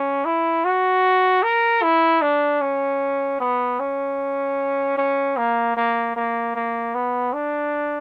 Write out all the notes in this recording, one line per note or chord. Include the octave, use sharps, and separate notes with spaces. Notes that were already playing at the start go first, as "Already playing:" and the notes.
Already playing: C#4
E4
F#4
A#4
E4
D4
C#4
B3
C#4
C#4
A#3
A#3
A#3
A#3
B3
D4